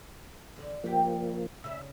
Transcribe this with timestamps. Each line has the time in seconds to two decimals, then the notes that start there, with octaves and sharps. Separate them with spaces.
0.56 E2 D3
0.84 G2 F3 A#3 G4
1.64 C#3 C#4 E5